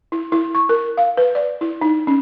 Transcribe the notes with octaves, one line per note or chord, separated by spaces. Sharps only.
E4
E4
C#6
A#4
F5
B4
D5
E4
D#4
C#4